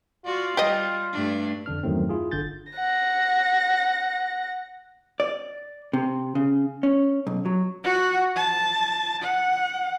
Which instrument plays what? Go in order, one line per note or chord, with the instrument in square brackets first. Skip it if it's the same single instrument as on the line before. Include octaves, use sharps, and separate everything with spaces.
[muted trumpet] F4 [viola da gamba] F#4 D5
[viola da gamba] G3 [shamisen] G4 D#5
[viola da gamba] G2 A3 D4
[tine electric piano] F2 D3 D4 F6
E2 G2 D#3 F#3 A3 C4
E4 F4 G#4
G1 D3 G6 A6
[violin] F#5 A#6
[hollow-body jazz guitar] D5
C3
C#3
C#4
B1
F#3
[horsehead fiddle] F#4 F#5
A5
F#5